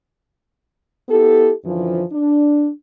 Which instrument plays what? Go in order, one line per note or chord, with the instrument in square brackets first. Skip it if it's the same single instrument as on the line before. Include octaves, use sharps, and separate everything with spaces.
[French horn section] B3 E4 G4 A4
F#2 D3 E3 F3
D4